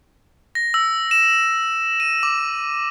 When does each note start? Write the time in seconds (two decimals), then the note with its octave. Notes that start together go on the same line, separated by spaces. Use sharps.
0.55 A#6
0.74 E6
1.11 E7
2.00 D#7
2.23 D6